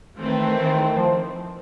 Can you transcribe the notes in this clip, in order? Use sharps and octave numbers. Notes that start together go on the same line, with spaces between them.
D#3 E3 A3 C4
D#3
F3